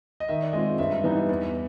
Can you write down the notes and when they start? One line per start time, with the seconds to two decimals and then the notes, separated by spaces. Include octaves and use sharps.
0.20 D#5
0.28 D#3 E5
0.42 D5
0.53 G#3 C4 F4 D#5
0.79 G2 E5
1.04 E3 G3 B3 D#4
1.29 E2